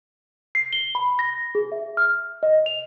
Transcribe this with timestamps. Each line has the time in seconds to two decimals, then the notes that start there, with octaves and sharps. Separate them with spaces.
0.55 C7
0.73 G7
0.95 B5
1.19 A#6
1.55 G#4
1.72 E5
1.97 F6
2.43 D#5
2.66 F7